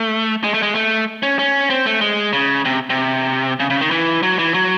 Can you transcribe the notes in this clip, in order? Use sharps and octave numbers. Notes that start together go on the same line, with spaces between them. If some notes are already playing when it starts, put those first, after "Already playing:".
Already playing: A3
G#3
A3
G#3
A3
C#4
C#4
C4
A3
G#3
C#3
C3
C3
C#3
C#3
D#3
E3
F#3
E3
F#3